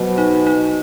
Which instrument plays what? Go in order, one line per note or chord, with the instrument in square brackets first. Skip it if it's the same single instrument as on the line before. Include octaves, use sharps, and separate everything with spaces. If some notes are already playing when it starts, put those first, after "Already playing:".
Already playing: [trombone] B2 [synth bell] F#3 C5
[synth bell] D#4
D#4